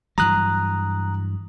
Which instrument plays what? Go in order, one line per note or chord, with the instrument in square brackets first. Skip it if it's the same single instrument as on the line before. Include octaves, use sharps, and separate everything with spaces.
[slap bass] G2 E3 F#3 [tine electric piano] A#5 D#6 F#6